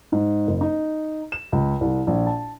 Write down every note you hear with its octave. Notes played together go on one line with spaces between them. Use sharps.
G#2
F#1
D#4
E7
C#2
C2
A#1
A5